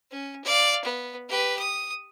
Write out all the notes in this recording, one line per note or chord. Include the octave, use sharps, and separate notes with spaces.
C#4
D5 F5
B3
G4 B4
D#6